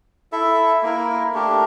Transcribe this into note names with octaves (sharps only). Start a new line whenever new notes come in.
E4 A4 E5
A#3 E4 A#4
A3 D4 G4 A#4